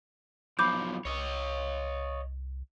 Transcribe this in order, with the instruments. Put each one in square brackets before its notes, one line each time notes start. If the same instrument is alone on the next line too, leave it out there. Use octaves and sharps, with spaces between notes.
[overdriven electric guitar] B1 F3 [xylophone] B5 D6 G6
[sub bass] C2 [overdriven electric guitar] C#5 D#5